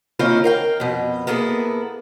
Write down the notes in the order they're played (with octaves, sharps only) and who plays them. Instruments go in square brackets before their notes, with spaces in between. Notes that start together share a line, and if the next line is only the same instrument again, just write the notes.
[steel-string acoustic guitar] D#3 A#3 C4 C#4 E4 F4
A#4 F5 G5
F2 B2
A#3 B3 E4 G#4 A4